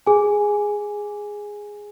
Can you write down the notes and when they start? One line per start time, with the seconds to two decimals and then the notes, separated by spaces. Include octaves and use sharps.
0.07 G#4 G#5